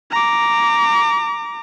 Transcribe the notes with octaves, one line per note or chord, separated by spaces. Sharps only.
A#5 D6